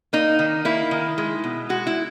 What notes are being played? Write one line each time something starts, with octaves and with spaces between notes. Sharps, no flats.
A#3 D#4
D#3
A#3 E4
D#3
G#3
B2
G#3 F#4
E4